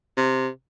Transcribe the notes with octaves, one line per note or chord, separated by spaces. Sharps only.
C3